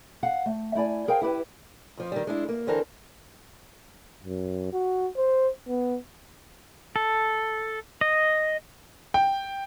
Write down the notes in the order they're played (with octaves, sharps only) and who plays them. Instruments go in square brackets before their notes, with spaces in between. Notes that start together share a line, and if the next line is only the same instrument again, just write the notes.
[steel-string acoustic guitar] F5 F#5
A3
A3 E4 D5 G#5
G#4 A#4 C5 F5 G5 G#5
E4 G4 B4
F2 F3
D#3 G3
G#3 D4 E4
A#3
E2 D3 E3 C4 A#4 A5
[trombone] F#2
F#4
C5
B3
[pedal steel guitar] A4
D#5
[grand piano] G5